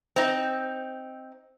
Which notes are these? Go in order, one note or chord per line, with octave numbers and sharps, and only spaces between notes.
C4 D#4